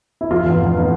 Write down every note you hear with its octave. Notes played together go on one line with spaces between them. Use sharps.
E4
F1 F4
E2 B2
F1
B2